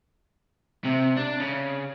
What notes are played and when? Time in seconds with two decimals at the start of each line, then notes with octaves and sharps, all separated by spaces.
0.84 C3
1.17 D4
1.40 C#3